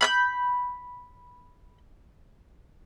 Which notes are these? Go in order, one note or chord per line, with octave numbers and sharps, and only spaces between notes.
B5 F#6 G6